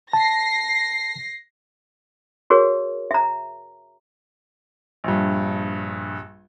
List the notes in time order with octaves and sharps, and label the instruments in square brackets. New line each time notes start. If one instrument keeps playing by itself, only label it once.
[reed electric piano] A5 [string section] A#6 C7
[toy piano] F#4 G#4 A#4 C#5
E5 A#5
[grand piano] A#1 G2